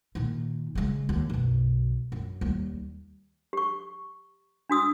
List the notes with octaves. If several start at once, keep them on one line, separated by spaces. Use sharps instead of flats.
A#2 D#3
C#3 G#3
D#2
B1 F#2
F#2
D#2 G3
G4 C#6
D4 F#4 D#6 E6